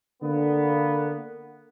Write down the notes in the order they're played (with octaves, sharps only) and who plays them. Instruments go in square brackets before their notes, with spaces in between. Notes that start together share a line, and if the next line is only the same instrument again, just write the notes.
[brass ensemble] D3 A#3 B3